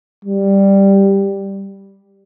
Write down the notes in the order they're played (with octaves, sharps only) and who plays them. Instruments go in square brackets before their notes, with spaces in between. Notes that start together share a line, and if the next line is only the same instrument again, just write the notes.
[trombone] G3